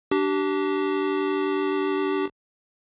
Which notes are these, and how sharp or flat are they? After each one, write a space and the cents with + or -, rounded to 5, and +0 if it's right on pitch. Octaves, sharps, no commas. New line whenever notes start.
D4 +0 G4 -30